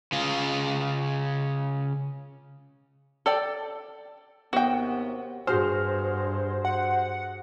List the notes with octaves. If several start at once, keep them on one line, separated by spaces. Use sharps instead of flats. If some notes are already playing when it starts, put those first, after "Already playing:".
C#3 F4
A4 D5 G5
D#2 C3 B3 F#4 G5
G2 F#4 G#4 C5 F6
F#5